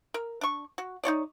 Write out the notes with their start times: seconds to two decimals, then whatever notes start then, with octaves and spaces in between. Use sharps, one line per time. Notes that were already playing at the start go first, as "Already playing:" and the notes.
0.14 A#4
0.41 D4 C#6
0.78 F#4
1.04 D#4 F4 C#5 D5